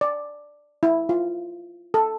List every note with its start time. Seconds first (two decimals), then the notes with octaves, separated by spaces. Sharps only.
0.01 D5
0.83 E4
1.09 F4
1.94 A4